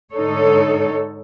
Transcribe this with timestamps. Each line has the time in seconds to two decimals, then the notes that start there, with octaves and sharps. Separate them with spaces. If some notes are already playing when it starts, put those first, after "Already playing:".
0.13 G#2 D3 D#4 A4 C#5